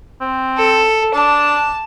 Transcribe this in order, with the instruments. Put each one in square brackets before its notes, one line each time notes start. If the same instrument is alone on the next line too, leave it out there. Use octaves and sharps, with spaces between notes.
[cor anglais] C4
[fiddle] A4
[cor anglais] D4 [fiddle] A5